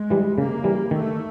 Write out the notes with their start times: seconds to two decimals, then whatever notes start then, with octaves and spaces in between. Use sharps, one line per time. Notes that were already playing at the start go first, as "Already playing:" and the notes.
Already playing: G#3
0.10 E3 G3
0.37 C#3 A#3
0.64 E3 G3
0.91 D#3 A3